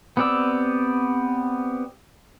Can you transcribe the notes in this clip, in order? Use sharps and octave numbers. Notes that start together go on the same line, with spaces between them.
B3 C4 G4 D5 E6